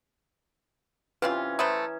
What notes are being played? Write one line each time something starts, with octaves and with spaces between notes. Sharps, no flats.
C3 E3 C4 C#4 F4 B4
A3 B4 C5 A#5 D#6